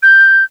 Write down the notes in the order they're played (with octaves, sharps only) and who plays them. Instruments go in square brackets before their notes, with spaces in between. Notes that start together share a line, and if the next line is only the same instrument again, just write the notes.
[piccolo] G6